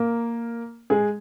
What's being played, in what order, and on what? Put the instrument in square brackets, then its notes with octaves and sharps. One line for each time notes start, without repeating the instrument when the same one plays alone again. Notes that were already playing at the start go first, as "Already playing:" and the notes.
Already playing: [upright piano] A#3 A#4
G#3 G#4